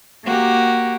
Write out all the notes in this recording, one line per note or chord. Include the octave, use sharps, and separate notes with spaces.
A#3 F#4 G4